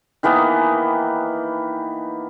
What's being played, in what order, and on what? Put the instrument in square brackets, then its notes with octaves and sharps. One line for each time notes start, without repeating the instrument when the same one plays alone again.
[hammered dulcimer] D#3 E3 A#3 B3